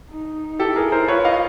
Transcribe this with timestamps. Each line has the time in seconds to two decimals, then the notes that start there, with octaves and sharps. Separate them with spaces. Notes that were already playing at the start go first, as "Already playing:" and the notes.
0.11 D#4
0.59 E4 G4 A4
0.76 G#4 A#4
0.92 A#4 C5
1.08 F4 B4 C#5
1.25 D#5 F5